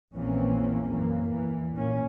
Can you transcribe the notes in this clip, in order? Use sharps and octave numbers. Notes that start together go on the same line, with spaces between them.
A#1 E2 E3 A#3 C4 C#4
F#2 E3 A#3
E2 E3
A#2 A#3 C#4